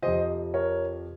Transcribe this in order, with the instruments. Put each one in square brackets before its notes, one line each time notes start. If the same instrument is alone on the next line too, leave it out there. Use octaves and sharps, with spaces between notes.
[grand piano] F2 C3 F3 C5 D#5
A#4 C#5